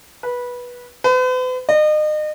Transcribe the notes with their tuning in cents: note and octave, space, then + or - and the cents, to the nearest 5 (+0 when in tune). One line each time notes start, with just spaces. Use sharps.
B4 -15
B4 +45
D#5 -35